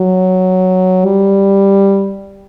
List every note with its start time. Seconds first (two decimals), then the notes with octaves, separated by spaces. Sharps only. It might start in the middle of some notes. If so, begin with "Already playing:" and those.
Already playing: F#3
1.05 G3